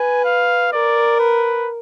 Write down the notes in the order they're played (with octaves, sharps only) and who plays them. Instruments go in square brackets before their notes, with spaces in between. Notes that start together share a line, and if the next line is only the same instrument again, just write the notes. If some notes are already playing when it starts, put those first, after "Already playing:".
Already playing: [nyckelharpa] B4 [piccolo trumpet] G#5
[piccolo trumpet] F5
[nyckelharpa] A#4 [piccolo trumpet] D5
[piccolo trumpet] B4